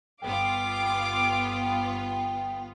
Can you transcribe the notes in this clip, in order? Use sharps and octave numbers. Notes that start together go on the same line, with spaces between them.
G1 B3 F4 F5 G5 D6